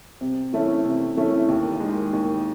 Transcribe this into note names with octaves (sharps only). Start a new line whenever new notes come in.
C3
E3 A3 C#4 E4
C3
E3 A3 C#4 E4
D#2
D#3 G#3
D#2